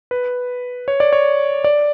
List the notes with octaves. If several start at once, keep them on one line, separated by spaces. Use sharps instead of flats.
B4
C#5
D5
C#5
D5